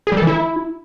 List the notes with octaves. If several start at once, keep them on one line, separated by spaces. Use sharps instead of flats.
G#4
G3
A4
E3
E4